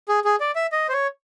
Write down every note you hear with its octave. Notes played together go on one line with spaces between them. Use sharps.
G#4
G#4
D5
E5
D#5
C5
C#5